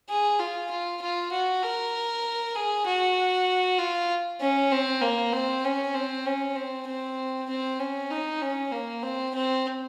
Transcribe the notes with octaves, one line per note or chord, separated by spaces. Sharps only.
G#4
F4
F4
F4
F#4
A#4
G#4
F#4
F4
C#4
C4
A#3
C4
C#4
C4
C#4
C4
C4
C4
C#4
D#4
C#4
A#3
C4
C4